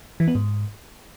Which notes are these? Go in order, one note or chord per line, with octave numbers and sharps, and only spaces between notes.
E3
B3
G#2